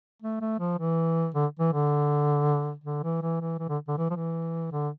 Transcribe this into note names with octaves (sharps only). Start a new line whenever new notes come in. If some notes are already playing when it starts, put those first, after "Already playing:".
A3
A3
F3
E3
D3
E3
D3
D3
E3
E3
E3
E3
D3
D3
E3
F3
E3
D3